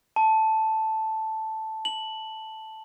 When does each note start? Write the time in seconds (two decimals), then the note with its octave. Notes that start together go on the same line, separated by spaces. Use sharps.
0.16 A5
1.85 F#7